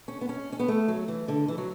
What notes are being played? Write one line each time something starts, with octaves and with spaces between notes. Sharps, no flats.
C#4
B3
C#4
C#4
B3
A3
F#3
E3
D3
E3
F#3